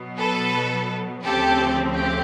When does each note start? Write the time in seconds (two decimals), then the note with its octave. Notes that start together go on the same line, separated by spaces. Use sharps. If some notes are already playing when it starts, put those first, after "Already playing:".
Already playing: B2 F#3 B3
0.18 A4 B4
1.24 D2 C#3 F3 A3 C4 G4 A4
1.94 G4